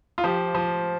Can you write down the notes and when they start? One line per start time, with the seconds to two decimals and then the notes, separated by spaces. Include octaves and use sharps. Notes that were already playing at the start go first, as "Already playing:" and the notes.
0.18 F4
0.24 F3 G4
0.55 F3